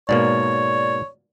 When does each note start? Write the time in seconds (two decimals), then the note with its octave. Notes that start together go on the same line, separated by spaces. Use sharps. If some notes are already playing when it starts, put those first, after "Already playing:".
0.09 G#2 B2 A#3 C#5 D5